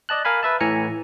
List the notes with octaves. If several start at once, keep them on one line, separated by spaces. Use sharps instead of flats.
D5 D#5 A5 F#6
A#4 F5 G#5 B5
B4 E5 A5
A2 E3 G#5 A#5 C#7